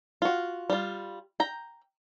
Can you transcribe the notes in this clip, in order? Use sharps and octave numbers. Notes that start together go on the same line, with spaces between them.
F4 F#4
G3 F4
G5 A#5